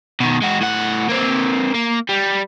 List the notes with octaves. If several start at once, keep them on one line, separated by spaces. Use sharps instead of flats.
B2 D#3
G#3 F#4
A2 F#5
A#3 C4
A#3
G3